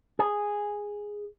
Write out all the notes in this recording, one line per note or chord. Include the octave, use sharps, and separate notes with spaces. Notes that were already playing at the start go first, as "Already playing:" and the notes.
G#4